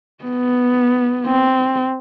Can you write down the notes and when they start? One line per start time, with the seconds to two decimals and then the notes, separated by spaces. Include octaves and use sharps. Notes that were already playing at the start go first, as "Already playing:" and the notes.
0.24 B3
1.27 C4